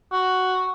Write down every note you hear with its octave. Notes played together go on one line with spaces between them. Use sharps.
F#4